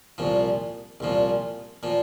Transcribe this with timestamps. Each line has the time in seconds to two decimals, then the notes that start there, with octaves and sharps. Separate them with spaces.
0.18 C2 A#2 F3
1.00 C2 A#2 F3
1.83 A#2 F3